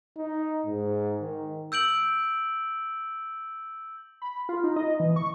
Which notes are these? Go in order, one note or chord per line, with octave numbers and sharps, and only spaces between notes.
D#4
G#2
D#3
E6 G6 D7 F#7
B5
F4
D#4
D#5
E3
C#6